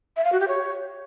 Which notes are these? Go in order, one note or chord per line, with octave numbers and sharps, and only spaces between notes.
E5
F5
F#4
G4
C#5